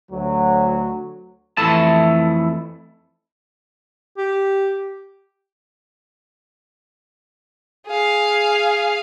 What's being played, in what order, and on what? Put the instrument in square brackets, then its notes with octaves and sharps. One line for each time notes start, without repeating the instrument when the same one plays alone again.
[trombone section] D2 F#3
[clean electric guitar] F2 E3 A3 E4 A5
[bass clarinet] G4
[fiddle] G#4 F5